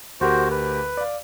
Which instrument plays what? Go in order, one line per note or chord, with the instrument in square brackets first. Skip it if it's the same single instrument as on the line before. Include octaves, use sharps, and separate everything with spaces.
[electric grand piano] D2 G4 A#4 [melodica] F#4 C5
[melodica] B4
[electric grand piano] D5 F5